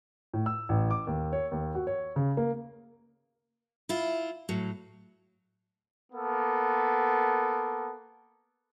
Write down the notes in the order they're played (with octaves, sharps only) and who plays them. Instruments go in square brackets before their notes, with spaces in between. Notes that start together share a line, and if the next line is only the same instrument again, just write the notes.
[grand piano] A2
E6
A1
D6
D#2
C#5
D#2
F#4
C#5
C#3
A#3
[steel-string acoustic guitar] E4 F4
A2 F#3
[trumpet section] A#3 B3 A4